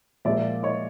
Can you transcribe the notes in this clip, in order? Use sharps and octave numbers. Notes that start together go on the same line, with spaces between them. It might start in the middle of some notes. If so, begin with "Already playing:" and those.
A#2 F3 G#3 D5 E5
C#5 D#5